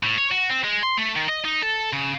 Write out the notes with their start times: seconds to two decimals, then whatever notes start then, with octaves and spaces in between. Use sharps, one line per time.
0.03 A2
0.18 C#5
0.31 F#4
0.50 C4
0.64 G#3
0.83 C6
0.98 A3
1.16 D#3
1.29 D#5
1.45 D#4
1.63 A4
1.93 C#3